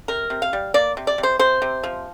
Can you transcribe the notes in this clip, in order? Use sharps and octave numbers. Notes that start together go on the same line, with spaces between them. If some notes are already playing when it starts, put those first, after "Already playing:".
C3 A#4
C3
F5
G3
A#3 D5
C3
D5
C3
C5
C3 C5
C3
F3